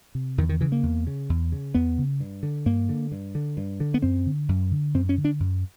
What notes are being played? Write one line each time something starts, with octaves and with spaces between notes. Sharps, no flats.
C3
E2 D#3
D#3
C#3 E3
A#3
E2
C#3
E2
C#3
E2 B3
C#3
G2
D3
G2 A#3
D3
G2
D3
G2
D3
B3
F#2 C4
D3
F#2
D3
F#2 C4
C#4
D3
D4
F#2